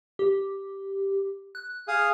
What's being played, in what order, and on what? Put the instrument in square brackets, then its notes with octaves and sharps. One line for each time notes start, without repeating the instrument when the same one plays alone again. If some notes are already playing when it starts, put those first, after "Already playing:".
[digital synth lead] G4
F#6
[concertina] G#4 F5 D#6